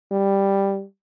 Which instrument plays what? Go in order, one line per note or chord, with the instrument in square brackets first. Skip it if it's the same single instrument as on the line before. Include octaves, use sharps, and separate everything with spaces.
[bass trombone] G3